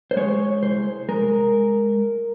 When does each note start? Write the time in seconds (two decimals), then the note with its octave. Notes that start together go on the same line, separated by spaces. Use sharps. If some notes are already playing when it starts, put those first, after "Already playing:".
0.11 C5
0.17 G#3 C#5
0.62 C2 C5
1.09 G#3 A#4